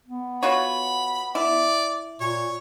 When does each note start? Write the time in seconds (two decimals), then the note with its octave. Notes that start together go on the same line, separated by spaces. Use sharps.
0.06 B3
0.43 F4 F#4 C#5 B5
1.35 E4 D5
2.21 A#2 C#5